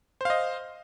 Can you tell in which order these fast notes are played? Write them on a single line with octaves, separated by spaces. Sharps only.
C5 F5 D#5